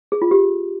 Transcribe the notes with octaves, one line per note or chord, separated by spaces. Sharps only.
G#4
F4
G4